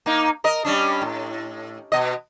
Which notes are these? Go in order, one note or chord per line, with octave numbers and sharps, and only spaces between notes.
A#3 D#4
A#4 D#5
G3 C#4 D4
A2
B2 D#5